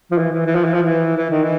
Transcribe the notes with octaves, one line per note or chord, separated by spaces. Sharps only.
F3
E3
E3
E3
F3
E3
F3
E3
E3
D#3
E3